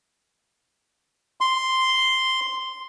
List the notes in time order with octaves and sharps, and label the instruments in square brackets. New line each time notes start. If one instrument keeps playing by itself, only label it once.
[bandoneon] C6